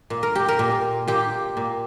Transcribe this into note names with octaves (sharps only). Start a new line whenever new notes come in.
A#2
A#4
G4
A#4
A#2
A#2 G4
A#2